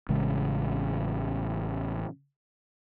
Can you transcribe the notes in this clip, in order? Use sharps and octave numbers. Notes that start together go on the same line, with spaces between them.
A1 C#3 G#3